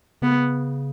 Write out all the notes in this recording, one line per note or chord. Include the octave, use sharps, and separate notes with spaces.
C#3 B3